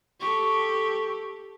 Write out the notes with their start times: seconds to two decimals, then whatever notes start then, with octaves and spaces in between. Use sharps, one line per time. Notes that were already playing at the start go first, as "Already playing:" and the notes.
0.20 G4 A4 C#6